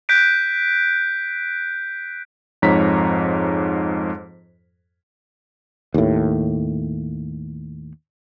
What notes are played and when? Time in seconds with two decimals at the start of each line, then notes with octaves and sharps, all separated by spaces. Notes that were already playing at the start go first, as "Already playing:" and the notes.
0.09 F#6 G6 B6 D7
2.62 F2 G#2 C#5 A#5 B6
5.94 D#2 A2